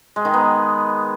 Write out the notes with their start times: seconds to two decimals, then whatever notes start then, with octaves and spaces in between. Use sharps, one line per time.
0.16 G#3
0.25 D#3
0.34 B3